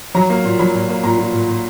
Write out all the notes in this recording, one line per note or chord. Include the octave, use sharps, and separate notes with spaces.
F#3 A#5
A#3
A#2
F#3 B5
A#2
A#3
A#2 A#5
A#2
A#2
A#2